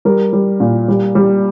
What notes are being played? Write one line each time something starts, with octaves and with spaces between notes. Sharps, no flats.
G3 A#4
G3
A#2
G3
G3